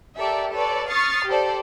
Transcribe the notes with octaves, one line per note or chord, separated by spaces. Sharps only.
G4 A4 A#4 D5 E5
A4 B4 C#5 D5
C#6 D#6 F6 A6 C7
G4 A4 C5 D5